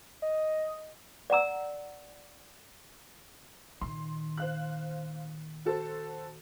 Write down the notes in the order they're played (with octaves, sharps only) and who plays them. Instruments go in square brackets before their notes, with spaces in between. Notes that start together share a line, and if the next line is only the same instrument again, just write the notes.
[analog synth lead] D#5
[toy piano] D5 F#5 A#5 E6
[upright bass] A#2 D#3 [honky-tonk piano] C6
[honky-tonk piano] C5 F5 F#6
F#4 A4 C5